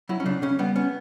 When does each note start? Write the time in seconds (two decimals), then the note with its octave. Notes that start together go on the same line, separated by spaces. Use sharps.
0.09 F#3 E4
0.20 C#4
0.26 C#3 D4
0.42 C#3 C#4
0.59 G3 B3
0.76 B3 C#4